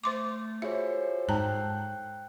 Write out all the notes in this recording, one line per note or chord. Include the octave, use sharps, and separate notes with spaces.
A3 C5 C6 D6
F4 F#4 G#4 A4 C5 C#5 E5
G#2 G5 A5 A#5 F#6